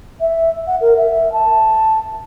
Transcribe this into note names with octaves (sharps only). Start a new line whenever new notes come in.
E5
F#5
A#4
E5
A5